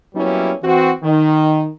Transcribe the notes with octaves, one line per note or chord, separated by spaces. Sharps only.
F#3 G3 A#3 B3 C#4 E4
E3 C4 F#4
D#3